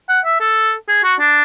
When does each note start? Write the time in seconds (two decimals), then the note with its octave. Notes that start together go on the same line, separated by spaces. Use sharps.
0.09 F#5
0.25 E5
0.40 A4
0.88 G#4
1.03 F#4
1.20 D4